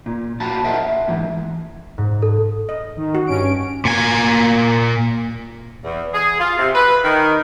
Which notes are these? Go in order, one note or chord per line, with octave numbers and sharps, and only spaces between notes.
A#2
A#2 F#4 F5 A5 B5
A#4 C5 D#5 E5 F#5
E5
G#2 E3
G#2
A4
D#5
D#3
F#4
G2 C#4 D7
A#2 G#5
E2
G#4
F4
C3
B4
D#3